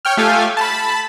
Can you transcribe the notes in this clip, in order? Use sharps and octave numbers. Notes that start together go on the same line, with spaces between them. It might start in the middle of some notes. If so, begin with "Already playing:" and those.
C#5 G5 F6
A3 F4 G4 A4 F5 G#5
A5 B5